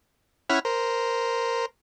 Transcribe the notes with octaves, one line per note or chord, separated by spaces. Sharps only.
C#4 E4 F#5 B5 F6
A#4 C5